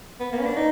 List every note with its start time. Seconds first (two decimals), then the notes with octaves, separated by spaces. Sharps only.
0.20 B3
0.32 A#3
0.39 C#4
0.44 D4
0.56 D#4